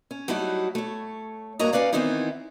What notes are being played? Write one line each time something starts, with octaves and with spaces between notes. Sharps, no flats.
C#4
F#3 G3 A3 D#4 E4 F#4
A3 C#5
G2 A#3 F#4 C#5 D#5 A#5
C#4 D#4 B4 D5 F5
D#3 E3 B3 C4 D#4 E4